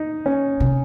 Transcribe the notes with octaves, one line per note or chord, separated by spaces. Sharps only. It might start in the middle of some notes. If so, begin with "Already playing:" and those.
Already playing: D#4
C#4
C3